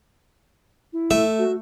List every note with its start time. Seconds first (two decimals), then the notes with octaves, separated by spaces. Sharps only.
0.93 E4
1.11 A3 E5
1.38 F#4